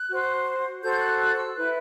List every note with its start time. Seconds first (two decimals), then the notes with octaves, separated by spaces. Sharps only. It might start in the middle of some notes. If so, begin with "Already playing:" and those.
Already playing: F#6
0.09 F#4 C5
0.82 F#4 A4 C5 G6
0.94 G6
1.00 F#6
1.18 F#6
1.37 E6
1.55 E4 B4 F#6